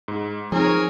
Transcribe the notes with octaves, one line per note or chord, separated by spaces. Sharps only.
G#2
F3 C4 D#4 G#4 A#4 C#5 G#5